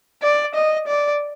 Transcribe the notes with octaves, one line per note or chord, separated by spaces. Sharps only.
D5
D#5
D5